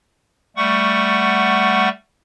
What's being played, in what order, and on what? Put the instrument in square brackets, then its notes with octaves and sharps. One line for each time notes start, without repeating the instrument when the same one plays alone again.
[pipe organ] G3 A3 F#5 C#6